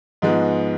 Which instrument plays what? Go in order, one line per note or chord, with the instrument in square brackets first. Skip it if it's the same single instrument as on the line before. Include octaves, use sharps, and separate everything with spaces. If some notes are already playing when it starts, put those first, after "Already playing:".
[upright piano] G#2 F3 G#3 B3